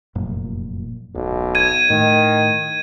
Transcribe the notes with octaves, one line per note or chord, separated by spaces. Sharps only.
F1 F#2 A#2
D1 B1
G#6 D#7
A2 D#3